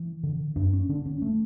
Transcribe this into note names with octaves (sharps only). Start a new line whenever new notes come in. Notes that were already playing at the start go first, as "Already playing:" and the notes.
Already playing: E3
D3
F#2 D4
C#4
D3 D4
C#4
A3